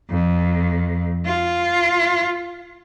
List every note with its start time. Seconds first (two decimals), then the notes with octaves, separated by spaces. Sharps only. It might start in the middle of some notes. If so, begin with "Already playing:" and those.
0.10 F2
1.26 F4